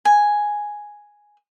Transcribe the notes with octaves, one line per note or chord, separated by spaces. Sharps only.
G#5